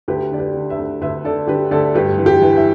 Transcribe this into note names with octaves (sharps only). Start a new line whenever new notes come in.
D2 G4 B4
D3 D5
G4 B4
D3
B4 E5
D2
D2 B4 E5
D3 A4 D5
D3 G4 B4
D2 A4 D5
G2 G4 B4
E3
G4
E3
E4